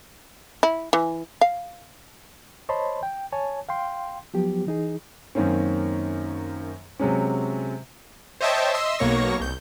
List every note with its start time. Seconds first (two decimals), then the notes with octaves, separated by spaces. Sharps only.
0.63 E4
0.93 E3
1.41 F5
2.69 C5 C#5 D#5 A5 B5 C6
3.03 G5
3.33 C#5 G#5 A5
3.69 F5 G5 C6
4.34 F3 F#3 B3 G4
4.67 E3 D#4 G#4
5.35 F#2 D#3 A#3 C4 C#4
6.99 C3 F#3 G#3 C#4
8.41 C5 C#5 D#5 E5 G5 A5
8.74 D#5 E5 C6 E6
8.99 B1 B2 A#3 C#5 C#6 A#6
9.40 C2 G6